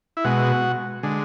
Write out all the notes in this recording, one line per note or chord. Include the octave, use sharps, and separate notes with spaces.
E4
B2 G#3 F#4
D3 G#3